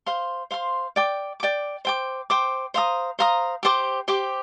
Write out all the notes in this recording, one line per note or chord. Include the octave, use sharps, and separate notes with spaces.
C5 F5 C6
C5 F5 C6
D5 G5 D6
D5 G5 D6
C5 G5 D6
C5 G5 D6
C5 F5 A#5 D#6
C5 F5 A#5 D#6
G4 C5 G5 D6
G4 C5 G5 D6